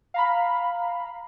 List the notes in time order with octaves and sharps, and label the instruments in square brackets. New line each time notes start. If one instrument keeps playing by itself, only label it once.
[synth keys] F5 A#5 B5